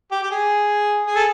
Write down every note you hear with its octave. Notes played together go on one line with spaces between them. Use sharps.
G4
G4
G#4
G#4
A4